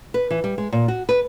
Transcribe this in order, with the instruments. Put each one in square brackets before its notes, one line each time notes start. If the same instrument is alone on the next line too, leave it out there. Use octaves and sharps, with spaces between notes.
[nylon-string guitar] B4
E3
G3
G#3
A#2
F#4
B4